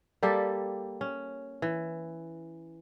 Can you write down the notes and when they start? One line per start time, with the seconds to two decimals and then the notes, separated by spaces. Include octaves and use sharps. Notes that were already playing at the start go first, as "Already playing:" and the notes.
0.23 G3 A#3 G4 A4
1.01 C#4
1.62 E3